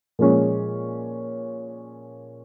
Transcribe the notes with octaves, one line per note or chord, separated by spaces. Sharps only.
A#2 F3 G#3 C#4